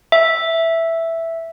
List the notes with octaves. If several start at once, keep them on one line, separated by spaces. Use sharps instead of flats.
E5